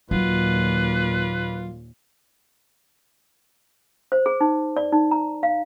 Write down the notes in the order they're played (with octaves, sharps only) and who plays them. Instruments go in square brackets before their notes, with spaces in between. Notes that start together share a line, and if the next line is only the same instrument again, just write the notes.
[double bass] D#2 A#2 [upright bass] F#3 [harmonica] F4 [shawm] B4
[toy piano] C5
G#4
D#4
D5
D#4
A#5
F5